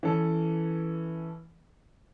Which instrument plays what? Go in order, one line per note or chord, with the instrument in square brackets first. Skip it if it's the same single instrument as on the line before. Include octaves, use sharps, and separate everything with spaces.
[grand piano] E3 C#4 A4